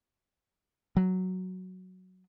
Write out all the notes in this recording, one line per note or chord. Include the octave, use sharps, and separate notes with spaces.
F#3